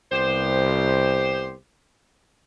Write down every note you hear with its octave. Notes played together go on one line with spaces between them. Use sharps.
C2 B3 G4 C5